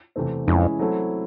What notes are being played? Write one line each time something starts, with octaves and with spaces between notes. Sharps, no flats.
E2 C3 E3 A3 C4
F2 E3 G#3 C#4 E4 G#4
F#3 A3 C4 E4 A4